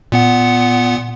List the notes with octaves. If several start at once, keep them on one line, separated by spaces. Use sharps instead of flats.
A#2 B3 F#5